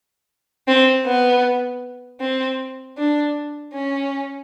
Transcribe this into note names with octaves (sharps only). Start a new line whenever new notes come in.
C4
B3
C4
D4
C#4